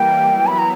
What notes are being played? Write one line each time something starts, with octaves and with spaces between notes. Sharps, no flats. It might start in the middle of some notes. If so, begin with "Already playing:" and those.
Already playing: E3 G3 A#3 G5
F#3 B3 E4
B5
A#5